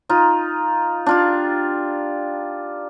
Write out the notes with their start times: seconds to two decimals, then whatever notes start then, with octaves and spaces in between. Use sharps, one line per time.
0.09 D#4 F4
1.06 D4 F4 G4